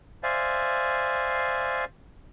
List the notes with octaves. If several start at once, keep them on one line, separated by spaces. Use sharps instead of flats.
C5 D5 E5 F5 G#5